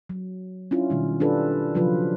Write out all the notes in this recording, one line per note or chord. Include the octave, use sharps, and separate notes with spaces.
F#3
C#4 D4 E4 F4
B2 D#3 G3
D4 F4 G4 A4 B4
C#3 F3 F#3 F4 B4